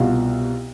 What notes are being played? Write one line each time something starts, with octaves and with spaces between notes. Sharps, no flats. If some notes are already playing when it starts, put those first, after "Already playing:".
Already playing: C2 B2 F4